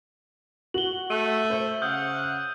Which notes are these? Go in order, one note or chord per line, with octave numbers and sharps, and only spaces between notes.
F#4 F#7 G7
A3 E6 D#7
C5 E5
C#3 F#5 D#6 F6 G6